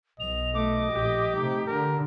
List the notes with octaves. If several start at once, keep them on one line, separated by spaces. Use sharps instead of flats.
B1 D#5 F7
A3 D6
A#1 A2 G4
C3 A3 D#4
D3 A#4